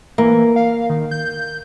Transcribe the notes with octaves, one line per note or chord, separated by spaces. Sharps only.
E3 A#3
F5
D#3
G6